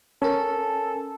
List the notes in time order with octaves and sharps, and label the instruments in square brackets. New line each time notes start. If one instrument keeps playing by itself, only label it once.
[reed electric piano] C#4 [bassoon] A4 [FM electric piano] A#4 G#5